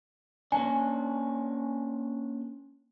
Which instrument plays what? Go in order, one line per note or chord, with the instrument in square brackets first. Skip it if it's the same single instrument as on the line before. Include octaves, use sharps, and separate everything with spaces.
[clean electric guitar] A#3 C#4 D4 [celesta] G#5